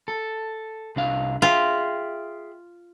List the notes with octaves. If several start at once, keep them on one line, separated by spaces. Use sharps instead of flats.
A4
C2 D4 F5
F4 G#4 E5 G5